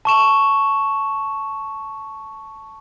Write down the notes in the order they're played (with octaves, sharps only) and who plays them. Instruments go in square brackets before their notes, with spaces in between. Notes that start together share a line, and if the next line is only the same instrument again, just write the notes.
[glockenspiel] A5 C#6 E7